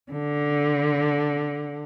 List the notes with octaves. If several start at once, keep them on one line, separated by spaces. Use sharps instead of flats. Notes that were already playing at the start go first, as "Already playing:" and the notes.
D3